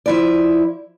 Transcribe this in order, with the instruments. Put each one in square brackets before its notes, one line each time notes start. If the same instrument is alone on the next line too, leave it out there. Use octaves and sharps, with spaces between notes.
[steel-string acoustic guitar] F3 E4 D5